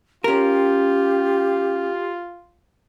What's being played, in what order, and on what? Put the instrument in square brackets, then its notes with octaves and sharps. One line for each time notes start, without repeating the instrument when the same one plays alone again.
[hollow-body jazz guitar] C#4 A#4 [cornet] F4 [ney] G4